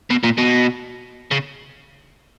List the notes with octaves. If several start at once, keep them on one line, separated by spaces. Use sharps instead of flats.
B2
A#2
B2
C#3